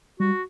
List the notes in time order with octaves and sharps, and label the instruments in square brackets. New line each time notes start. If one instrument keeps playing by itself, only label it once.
[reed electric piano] G3 [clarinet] F#4